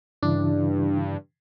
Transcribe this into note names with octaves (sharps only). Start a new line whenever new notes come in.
G2 C#3 E3 D4 E4